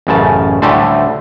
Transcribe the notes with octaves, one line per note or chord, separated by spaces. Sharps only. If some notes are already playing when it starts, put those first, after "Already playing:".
A1 F#2 C#3 A5
D2 A2 D3 G3 A3 C5